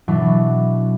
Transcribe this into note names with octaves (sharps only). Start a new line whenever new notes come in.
B2 E3 F#3 D4